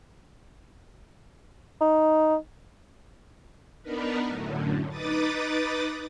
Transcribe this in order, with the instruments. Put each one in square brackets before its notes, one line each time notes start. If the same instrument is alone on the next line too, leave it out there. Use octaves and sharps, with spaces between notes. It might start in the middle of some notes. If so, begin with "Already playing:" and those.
[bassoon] D#4
[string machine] B3 D4 D#4 A#4 B4
F#2 A2 D3
D#4 B4 D6 D#6 A6